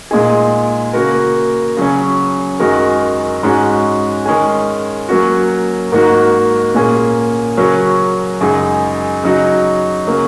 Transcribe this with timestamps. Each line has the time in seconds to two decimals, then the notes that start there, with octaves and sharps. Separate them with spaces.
0.11 A#2 G#3 D#4 G#4
0.93 C#3 A#3 F#4 A#4
1.77 C#3 F#3 C#4
2.60 F#2 D#3 G#3 F#4 A#4
3.43 G#2 G#3 C#4 F#4
4.25 D#3 G#3 C#4 G#4
5.09 F#3 A#3 C#4 F#4
5.92 G#2 D#3 A#3 F#4
6.74 A#2 A#3 C#4 G#4
7.57 C#3 F#3 C#4 F#4 A#4
8.41 F#2 C#3 G#3 D#4 G#4
9.23 C#3 F#3 D#4 F#4
10.07 C#3 F#3 A#3